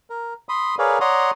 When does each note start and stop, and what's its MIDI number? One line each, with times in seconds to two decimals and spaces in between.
0.10 0.34 70
0.49 0.75 83
0.49 0.75 84
0.49 0.75 87
0.79 0.99 68
0.79 0.99 70
0.79 0.99 71
0.79 0.99 73
0.79 0.99 74
0.79 0.99 77
1.01 1.31 73
1.01 1.31 74
1.01 1.31 78
1.01 1.31 82
1.01 1.31 84
1.01 1.31 87